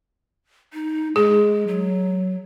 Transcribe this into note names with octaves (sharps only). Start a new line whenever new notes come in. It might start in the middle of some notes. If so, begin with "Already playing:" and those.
D#4
G#3 G#4
F#3